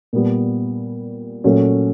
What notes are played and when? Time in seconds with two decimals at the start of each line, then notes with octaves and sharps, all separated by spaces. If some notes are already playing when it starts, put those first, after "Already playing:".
0.13 A#2 G3 B3
1.44 A#2 F#3 A3 C#4